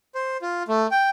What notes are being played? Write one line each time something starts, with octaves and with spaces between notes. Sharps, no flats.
C5
F4
A3
G5